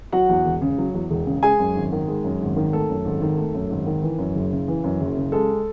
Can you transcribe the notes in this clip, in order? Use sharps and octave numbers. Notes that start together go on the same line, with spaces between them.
F#3 F#4 F#5
E2
E1
C#3
F#3
E2
E1
C#3
G#3 G#4 G#5
F#2
G#1
D#3
G#3
F#2
G#1
D#3
A3 A4
F#2
G#1
D#3
A3
F#2
G#1
D#3
E3
F#2
F#1
C#3
E3
F#2
F#1
C#3
G#3 A4